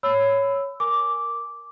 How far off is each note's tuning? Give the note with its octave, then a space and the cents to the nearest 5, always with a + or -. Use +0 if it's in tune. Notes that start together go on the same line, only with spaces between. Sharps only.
C#5 +0 B5 +20 E6 +0
A#4 +0 G#5 +0 D6 -5